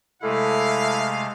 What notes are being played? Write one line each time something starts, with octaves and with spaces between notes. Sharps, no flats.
C3 G#3 A3 E4 A4 F5